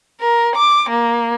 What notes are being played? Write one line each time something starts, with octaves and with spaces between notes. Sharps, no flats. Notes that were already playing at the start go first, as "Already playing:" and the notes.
A#4
D6
A#3